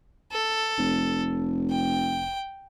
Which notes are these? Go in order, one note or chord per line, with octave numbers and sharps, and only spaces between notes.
A4
F1
G5